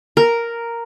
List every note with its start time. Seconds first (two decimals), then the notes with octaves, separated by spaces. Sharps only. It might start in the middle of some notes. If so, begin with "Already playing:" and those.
0.17 A#4